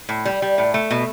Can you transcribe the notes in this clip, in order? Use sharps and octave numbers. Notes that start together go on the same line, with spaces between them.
A2
G3
G3
A2
A3
B2